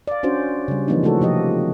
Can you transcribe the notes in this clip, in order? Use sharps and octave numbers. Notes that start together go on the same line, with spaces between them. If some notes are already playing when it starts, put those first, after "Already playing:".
D5 F5
C#4 D4 F#4 C5
C#3 G3
E3 F3 A#3 C4 D4 D#4
C#3 A3 F4 F#4 A4 C#5
C3 F3 G4 D#5